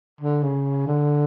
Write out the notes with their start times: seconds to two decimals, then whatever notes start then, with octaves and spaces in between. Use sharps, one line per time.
0.21 D3
0.43 C#3
0.87 D3